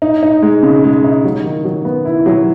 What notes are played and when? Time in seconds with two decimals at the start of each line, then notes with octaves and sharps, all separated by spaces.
0.02 D#4
0.23 D#4
0.42 G#3
0.63 C#3
0.84 G#3
1.04 D#4
1.24 F#3
1.44 D#3
1.65 F#3
1.85 B3
2.05 E4
2.26 F#3